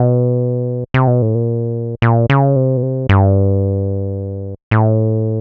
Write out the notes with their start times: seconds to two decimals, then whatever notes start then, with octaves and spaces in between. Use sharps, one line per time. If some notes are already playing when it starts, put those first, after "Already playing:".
Already playing: B2
0.94 C3
1.07 B2
1.22 A2
1.35 A#2
2.02 A#2
2.30 C#3
2.56 C3
2.77 B2
2.83 C3
3.09 G2
4.71 A2